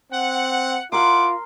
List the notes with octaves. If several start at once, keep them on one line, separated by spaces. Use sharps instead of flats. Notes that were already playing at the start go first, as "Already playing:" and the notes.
C4 F#5
E4 F4 A#4 F#5 C6 D6